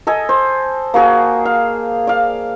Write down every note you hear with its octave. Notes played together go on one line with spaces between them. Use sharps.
A4 D#5 G#5
C5
A#3 F#4 G#4
F5
D5 F5